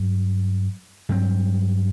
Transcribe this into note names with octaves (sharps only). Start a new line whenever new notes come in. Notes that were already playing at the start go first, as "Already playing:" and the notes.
Already playing: G2 F#3
G2 F#3 C4